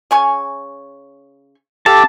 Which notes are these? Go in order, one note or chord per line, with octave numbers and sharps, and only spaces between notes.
C#3 G#5 C#6
G4 A4 F5 A5 D6